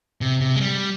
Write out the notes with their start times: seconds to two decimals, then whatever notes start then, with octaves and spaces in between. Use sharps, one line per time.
0.21 C3
0.41 C3
0.56 G#3
0.61 G3